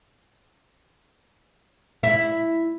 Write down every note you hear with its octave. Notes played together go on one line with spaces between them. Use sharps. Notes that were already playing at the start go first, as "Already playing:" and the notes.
E4